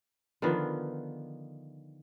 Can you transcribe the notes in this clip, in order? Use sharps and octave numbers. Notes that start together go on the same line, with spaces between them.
D3 D#3 F3 B3